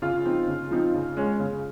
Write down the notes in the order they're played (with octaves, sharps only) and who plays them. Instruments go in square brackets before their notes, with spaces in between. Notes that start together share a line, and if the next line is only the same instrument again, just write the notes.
[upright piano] C#3 F4
F3 C4 D#4
C#3
F3 C4 D#4
C#3
G#3 C#4
C#3